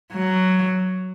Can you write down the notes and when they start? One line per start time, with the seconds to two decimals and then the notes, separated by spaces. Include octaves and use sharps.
0.13 F#3